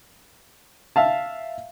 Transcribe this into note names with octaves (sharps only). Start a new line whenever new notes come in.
E5 F5 A5